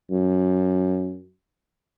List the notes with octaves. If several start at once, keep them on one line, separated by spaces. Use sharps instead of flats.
F#2